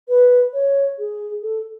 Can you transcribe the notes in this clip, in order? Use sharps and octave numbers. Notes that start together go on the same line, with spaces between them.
B4
C#5
G#4
A4